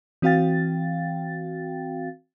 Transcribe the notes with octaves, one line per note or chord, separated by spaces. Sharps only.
E3 C4 F#4 F5 G5 A6